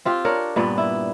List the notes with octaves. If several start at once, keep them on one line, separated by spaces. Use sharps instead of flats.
C4 F4 G4
D4 A#4 C#5
G2 A#2 B3 D5
E4